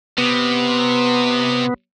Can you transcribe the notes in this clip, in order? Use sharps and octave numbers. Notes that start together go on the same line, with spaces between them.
C3 B3